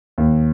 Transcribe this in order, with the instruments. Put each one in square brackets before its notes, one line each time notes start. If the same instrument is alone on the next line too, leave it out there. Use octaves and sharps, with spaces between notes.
[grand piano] D#2